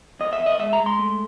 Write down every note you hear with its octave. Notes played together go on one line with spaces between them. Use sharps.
E2 D#5
E5
E2
D#5
G#3 E5
A#5
G#3
C6
A3